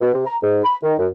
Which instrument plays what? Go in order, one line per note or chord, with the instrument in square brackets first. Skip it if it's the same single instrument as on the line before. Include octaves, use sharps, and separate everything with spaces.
[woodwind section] B2
C3
A#5
G#2
B5
D#3
F#2